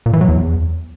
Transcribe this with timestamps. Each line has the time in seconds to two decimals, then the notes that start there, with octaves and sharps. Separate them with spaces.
0.06 A#2
0.13 E3
0.21 F#3
0.29 E2